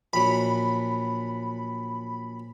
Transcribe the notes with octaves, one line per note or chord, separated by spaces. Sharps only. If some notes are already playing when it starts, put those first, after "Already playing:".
A#1 F#3 B5